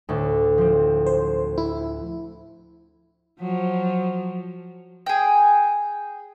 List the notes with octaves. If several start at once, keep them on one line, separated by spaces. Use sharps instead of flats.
D2 A2 D4
F3 C4
C5
E4
F3 F#3
G#4 G5